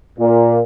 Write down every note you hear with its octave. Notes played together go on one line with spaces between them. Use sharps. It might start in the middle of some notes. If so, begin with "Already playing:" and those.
A#2